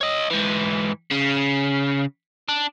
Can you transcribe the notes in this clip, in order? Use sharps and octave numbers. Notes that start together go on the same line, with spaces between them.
C#5 D#5
G#2 E3
C#3
D4